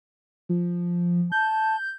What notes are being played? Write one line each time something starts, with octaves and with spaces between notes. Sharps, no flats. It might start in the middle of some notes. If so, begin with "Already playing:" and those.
F3
A5 G6